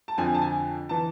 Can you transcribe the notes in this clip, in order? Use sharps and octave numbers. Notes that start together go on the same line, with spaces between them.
A5
F2 D3 F3 G#5
A5
G#5
E3 A5